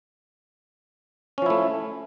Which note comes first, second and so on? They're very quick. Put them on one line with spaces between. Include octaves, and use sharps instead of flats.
C#4 F3 E4 A3